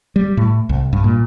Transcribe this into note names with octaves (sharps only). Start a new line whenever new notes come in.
G3
A2
C2
G2
A#2